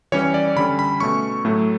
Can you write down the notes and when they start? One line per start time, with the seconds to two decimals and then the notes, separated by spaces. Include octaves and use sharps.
0.12 E3 G3 C#4 C#5
0.34 D5
0.56 D3 G3 C#4 B5
0.79 B5
1.00 B2 A3 C#4 C#6
1.45 A2 F#3 A3